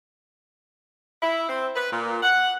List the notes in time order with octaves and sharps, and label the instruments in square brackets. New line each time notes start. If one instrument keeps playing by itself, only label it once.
[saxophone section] E4
C4
B4
A#2
F#5